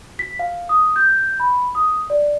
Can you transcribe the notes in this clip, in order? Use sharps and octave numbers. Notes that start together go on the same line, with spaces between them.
B6
F5
D#6
G6
B5
D#6
D5